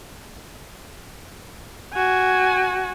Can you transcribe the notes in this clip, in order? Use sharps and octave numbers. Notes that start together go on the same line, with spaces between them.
F#4 G#5